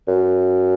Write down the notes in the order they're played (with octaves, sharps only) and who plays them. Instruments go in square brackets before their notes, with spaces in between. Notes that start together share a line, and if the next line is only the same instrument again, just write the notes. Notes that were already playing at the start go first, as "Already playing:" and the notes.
[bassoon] F#2